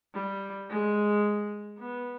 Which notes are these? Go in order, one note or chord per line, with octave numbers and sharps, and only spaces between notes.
G3
G#3
B3